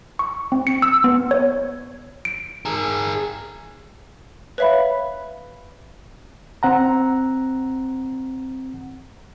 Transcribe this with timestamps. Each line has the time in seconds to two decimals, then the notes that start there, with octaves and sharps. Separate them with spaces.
0.19 C#6
0.52 C4
0.67 C#7
0.82 E6
1.04 B3
1.31 C#5
2.25 D7
2.65 G#4 A#4
4.58 B4 C#5 E5 F5 B5
6.63 C4 F#5 A#5